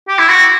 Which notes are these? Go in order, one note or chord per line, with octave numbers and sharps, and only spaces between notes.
G4
E4
F#4